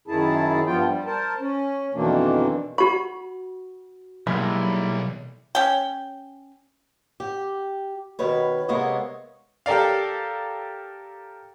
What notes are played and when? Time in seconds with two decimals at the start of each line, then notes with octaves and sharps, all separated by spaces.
0.08 F#2 D#3 E4 G#4 A5
0.67 G2 F3 B3 F4 G5
0.86 G3
1.06 A#4 C5 A5
1.40 C#4
1.95 F2 B2 D#3 E3 A#3 D4
2.78 F#4 B5 C#6
4.27 B1 G3 G#3 A#3 E4
5.55 C#4 G5
7.20 G4
8.19 B2 D#3 B4 C#5
8.68 C3 G#3 A#3 B3 C#5 D#5
9.66 G4 A4 A#4 D5 F5